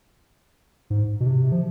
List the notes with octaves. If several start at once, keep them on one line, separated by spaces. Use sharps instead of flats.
G#2
B2
C3
F3